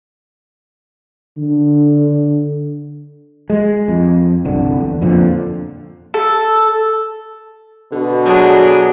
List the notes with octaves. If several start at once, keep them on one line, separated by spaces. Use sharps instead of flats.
D3
G#3
F2
G1 C2 D3
E2
F2 A#2 D3 F3
A4
B2 D3
F#3 D4 G#4